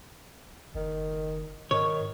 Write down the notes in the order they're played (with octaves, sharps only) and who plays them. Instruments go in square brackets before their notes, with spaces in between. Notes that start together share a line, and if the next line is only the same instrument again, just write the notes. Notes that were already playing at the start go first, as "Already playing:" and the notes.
[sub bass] F#1 [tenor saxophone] D#3
[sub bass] G#2 [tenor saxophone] D#3 [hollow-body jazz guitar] C#5